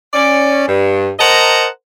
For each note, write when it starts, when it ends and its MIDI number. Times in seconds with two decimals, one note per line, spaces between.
0.14 0.63 61
0.14 0.63 74
0.68 1.10 43
1.19 1.66 70
1.19 1.66 72
1.19 1.66 75
1.19 1.66 78
1.19 1.66 81
1.19 1.66 82